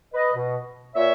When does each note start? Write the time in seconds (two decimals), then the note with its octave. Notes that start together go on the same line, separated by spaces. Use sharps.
0.14 B4 D#5
0.34 B2
0.95 A#2 C#5 E5